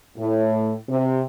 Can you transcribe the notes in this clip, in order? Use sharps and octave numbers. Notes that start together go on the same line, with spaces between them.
A2
C3